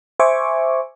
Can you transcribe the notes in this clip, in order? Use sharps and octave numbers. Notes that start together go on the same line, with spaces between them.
C5 E5 G#5 C#6 D6